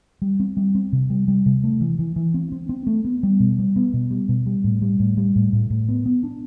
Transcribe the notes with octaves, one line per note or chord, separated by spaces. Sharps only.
G3
C4
G3
C4
C3
G3
G3
C3
A3
E3
E3
E3
C4
C4
C4
A3
B3
G3
B2
G3
B3
B2
G3
B2
G3
A2
G3
A2
G3
A2
A2
A2
B3
B3
D4